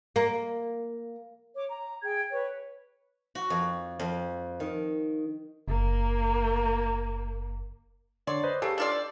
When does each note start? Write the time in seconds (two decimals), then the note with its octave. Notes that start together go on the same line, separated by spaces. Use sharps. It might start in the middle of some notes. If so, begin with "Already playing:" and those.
0.16 A#3
1.56 C#5 D6
1.69 A#5
2.02 G#4 G5 G#6
2.31 B4 C#5
3.35 F#4
3.50 F2
3.99 F2
4.60 D#3
5.68 F#1 A#3
8.27 D3 C#5 D5 C6
8.43 B4 C5 D#5
8.62 C#3 G4 A4
8.78 D4 F4 D5